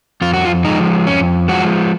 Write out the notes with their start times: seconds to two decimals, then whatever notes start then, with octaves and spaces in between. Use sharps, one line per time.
0.21 F2 F4
0.34 F#4
0.45 F4
0.64 F3 G#3 D#4
1.06 F2 C#4
1.48 F3 G#3 F#4